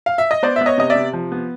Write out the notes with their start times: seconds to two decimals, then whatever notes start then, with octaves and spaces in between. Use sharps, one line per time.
0.06 F5
0.18 E5
0.31 D#5
0.43 B3 C5 D5
0.56 B3 E5
0.66 C#5 D#5
0.78 C3 D#5
0.90 D5 E5
0.95 C3
1.13 F3
1.32 B3